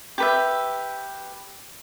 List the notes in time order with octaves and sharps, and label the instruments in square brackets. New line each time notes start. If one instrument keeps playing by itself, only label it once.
[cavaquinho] G4 B4 E5